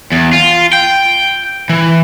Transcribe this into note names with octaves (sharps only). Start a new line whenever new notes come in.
E2
F4
G5
E3